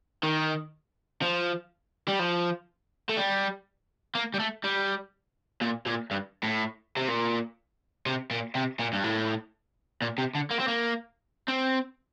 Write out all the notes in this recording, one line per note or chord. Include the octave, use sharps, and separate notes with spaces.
D#3
F3
G3
F3
A3
G3
A#3
G3
A3
G3
A#2
A#2
G2
A2
C3
A#2
C3
A#2
C3
A#2
G2
A2
A#2
C3
D3
A#3
C4
A#3
C4